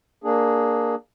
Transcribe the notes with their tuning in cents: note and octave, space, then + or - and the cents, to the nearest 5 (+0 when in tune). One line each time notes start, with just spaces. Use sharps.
A#3 +0 D4 +10 G#4 +0